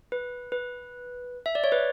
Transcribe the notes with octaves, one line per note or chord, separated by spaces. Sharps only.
B4
B4
E5
D5
C#5
B4